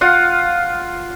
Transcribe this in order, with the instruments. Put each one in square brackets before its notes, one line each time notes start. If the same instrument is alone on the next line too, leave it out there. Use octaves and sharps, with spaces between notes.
[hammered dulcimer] F4 F5 F#5